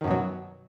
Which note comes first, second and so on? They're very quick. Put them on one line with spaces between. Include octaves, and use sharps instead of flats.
D#3 F#2 B2 F#3